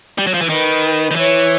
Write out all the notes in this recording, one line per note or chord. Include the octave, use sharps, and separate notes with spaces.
G3
F#3
F3
E3
D#3 B4
D#3
E3 C#5